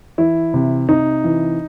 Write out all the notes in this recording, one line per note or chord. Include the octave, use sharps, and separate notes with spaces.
E3 E4
C3
C3 D#4
E3